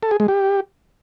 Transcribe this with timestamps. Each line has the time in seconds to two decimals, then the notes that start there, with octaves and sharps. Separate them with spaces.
0.03 A4
0.11 G#4
0.20 G#3
0.28 G4